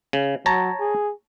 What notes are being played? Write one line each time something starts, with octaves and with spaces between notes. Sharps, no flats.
C#3
F#3 C#5 A5 A#5
G#4